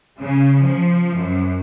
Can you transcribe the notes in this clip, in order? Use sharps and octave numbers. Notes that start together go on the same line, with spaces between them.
C#3
F3
F#2